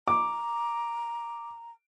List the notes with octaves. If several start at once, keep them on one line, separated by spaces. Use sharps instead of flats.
A#5 D6